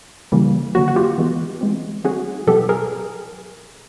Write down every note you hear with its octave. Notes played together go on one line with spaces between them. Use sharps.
C#3 E3 G3 A#3
D3 F#3 A#3 F#4
F#4
F4 G4
E3 G#3 B3
E3 G#3 C4
D#3 F#3 A3 C4 F#4 G#4
B2 F#3 B3 G4 A4
G#4 A#4